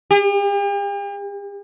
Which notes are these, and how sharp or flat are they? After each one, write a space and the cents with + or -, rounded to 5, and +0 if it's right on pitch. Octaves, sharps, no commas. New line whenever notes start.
G4 +45